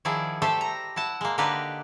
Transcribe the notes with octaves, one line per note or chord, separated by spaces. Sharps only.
D#3 F3 E4 G#4 D5
A3 G4 A4 C5 E5
A#5
E4 F#5 A5
G#3 A#3
D3 A#3 D#4 G4 B4 D5